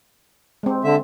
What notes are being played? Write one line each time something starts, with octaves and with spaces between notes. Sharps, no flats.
G#3 C4
D3 E5